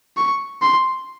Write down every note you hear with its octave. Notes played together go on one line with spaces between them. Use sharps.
C#6
C6